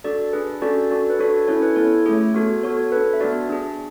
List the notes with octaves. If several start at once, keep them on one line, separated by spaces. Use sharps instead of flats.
D4 F#4 A4 D5
D4 G#4 B4
C#4 F#4 A4 D5
D4 F#4 A4 D5
B4
D4 F#4 A4 C#5
C#4 E4 A4 C#5
B4
B3 E4 A4 C#5
A3 C#4 G#4 C#5
B3 F#4 A4
B3 F#4 A4 C#5
C#5
D4 A4 B4
E5
B3 D4 F#4 D5
D4 G#4